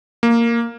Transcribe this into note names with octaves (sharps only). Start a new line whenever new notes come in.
A#3